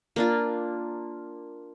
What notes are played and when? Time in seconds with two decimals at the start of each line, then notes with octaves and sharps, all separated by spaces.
0.16 A#3 D4 F4